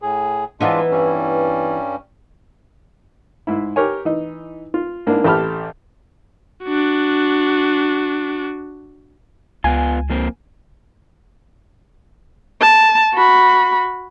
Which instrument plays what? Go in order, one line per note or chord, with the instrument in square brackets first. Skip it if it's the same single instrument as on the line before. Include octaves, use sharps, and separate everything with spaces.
[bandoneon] A2 G#4
[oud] E3 B3 D#4 [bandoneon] G#3 D4 F4
[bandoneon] G2 G3 C#4
[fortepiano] G#2 E4
G4 A#4 C#5 G#5
E3 D#4
F4
G#2 A#3 D4 E4
A1 A3 G4 A5 B5 F6
[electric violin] D4 F#4
[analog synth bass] C#2 [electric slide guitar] B3 F4 [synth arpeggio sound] G#5
[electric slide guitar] F3 A#3 C4
[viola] A5
F#4 B5